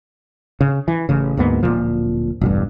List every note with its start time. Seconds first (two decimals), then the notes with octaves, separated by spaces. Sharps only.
0.61 C#3
0.88 E3
1.09 A1 C#3
1.37 D2 G#2 A#3 B3
1.63 D1 C2 A#2 F3
2.41 E1 A1 G2